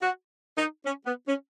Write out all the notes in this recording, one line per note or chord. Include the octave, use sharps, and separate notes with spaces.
F#4
D#4
C#4
B3
C#4